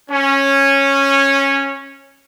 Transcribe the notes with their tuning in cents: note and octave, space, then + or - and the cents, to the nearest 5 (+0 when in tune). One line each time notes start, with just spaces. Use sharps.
C#4 -10